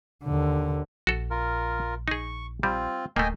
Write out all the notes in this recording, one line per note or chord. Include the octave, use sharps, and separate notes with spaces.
D#2 D3
A#1 F#4 A4
F4 A#4
D#4 G#4 C#6
G3 C4 F4
D1 A3 A#3 D#5 G5 G#5